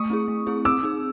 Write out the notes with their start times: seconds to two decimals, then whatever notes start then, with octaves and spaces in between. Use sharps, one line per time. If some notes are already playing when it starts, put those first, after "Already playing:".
Already playing: A3 C#6 D#6
0.10 C4 E4 G#4
0.28 A3
0.47 C4 E4 G#4
0.65 C4 D6 E6
0.83 D#4 G#4